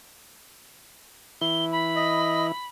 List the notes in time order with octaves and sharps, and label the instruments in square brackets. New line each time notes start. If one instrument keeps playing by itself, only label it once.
[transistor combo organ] E3 E4 [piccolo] G7
[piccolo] B5
[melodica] D#5